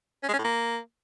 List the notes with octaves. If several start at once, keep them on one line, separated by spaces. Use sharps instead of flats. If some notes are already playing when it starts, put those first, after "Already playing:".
C#4
G#3
C#4
A2
A#3